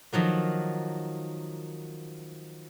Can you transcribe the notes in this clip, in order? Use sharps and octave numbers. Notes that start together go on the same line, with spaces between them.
D#3 F3 F#3 A#3